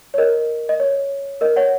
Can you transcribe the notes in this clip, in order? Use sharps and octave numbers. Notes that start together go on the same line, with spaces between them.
C#5
A#4 D#5
D#5
C#5
A#4 D#5
C#5 F#5